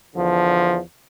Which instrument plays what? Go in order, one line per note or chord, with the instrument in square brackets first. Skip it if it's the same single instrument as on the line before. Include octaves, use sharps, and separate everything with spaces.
[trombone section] E2 D3 F3